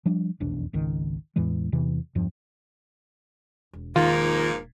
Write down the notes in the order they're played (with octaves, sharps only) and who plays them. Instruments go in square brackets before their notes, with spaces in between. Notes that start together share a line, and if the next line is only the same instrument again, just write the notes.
[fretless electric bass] F3 G3 D4
F1 B1 E2 D4
G#1 C#2 D#3
E2 A2 E3 G#3
E2 C3 E3
E2 G2 F3
[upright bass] E1
[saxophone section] G#2 F3 A#3 [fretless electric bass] D#3 [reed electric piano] F4